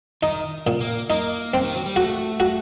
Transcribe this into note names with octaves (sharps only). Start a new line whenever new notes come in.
D#3 D#4
A#2
A#3
A#3 D#4
C4
D#3
F#3
G3
A3 F#4
F#4